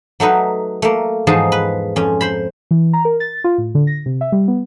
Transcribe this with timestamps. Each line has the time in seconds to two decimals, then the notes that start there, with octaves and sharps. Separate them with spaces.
0.20 F#3 A3 D#4 B4
0.82 A3 A#3
1.27 E2 G#2 F3 D#4 G#4 A5
1.52 B4
1.96 F2 C#4
2.21 C5 B5
2.71 E3
2.93 A#5
3.05 A#4
3.20 A6
3.44 F4
3.58 A2
3.75 D3
3.87 A#6
4.06 C3
4.21 E5
4.32 G3
4.48 B3